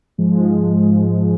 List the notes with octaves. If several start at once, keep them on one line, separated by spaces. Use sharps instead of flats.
G#2 F3 G#3